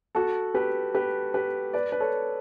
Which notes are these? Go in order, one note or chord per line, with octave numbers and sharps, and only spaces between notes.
F#4 A4
G4 B4
G4 B4
G4 B4
B4 D5
B4
A4 C#5